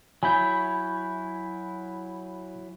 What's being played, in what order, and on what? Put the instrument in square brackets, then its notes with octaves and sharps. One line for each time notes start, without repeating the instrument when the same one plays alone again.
[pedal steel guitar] F#3 E4 C#5 [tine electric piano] G#5 B5 G6